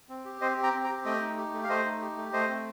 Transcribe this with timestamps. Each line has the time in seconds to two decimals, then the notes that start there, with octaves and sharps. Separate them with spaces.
0.09 C4
0.25 G4
0.41 C4 C5 D#5
0.57 G4
0.63 G5 A#5
0.74 C4
0.84 G5 A#5
0.89 G4
1.05 A3 D#5 G5
1.21 D#4
1.37 G4
1.54 A3
1.64 F5
1.69 A3 C5 D#5
1.85 D#4
2.01 G4
2.17 A3
2.33 A3 C5 D#5
2.49 C4